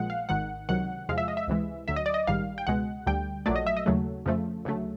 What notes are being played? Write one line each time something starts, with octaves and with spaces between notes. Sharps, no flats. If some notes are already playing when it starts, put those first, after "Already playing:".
Already playing: A#1 A#2 F3 G#3 F#5
F5
G#1 G#2 D#3 F#5
C#2 C3 D#3 F#3 F#5
E2 C3 F3 G#3 F5
E5
D#5
E5
C#2 C3 E3 G#3
D2 D3 F#3 E5
D#5
D5
D#5
A#1 G#2 D#3 G3 F5
G5
C#2 B2 G#3 F#5
D2 D3 G3 G5
A#1 A#2 F#3 A3 D5
D#5
E5
D#5
D#2 C#3 F#3 A3
F2 C#3 F3 A3
D2 C#3 F#3 A3